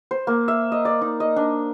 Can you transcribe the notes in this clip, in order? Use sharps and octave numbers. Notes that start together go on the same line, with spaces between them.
C5
A#3
E5
D#5
D5
D#4
D#5
D4